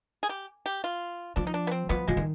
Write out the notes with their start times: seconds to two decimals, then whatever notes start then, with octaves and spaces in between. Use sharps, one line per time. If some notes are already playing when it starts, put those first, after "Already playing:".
0.23 G#4
0.29 G4
0.66 G4
0.84 F4
1.36 F3 D4
1.47 D#4
1.54 D4
1.67 B3
1.71 C4
1.89 F3 B3
2.08 F3 G#3
2.17 D#3